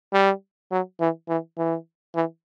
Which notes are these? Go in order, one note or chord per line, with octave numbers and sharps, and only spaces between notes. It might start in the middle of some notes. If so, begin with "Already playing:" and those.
G3
F#3
E3
E3
E3
E3